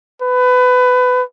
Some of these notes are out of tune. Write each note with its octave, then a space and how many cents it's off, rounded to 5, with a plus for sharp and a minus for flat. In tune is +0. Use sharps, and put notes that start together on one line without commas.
B4 +20